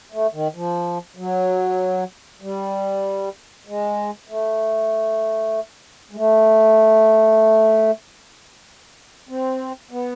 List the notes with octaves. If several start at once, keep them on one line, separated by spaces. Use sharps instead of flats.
A3
D#3
F3
F#3
G3
G#3
A3
G#3
A3
C4
B3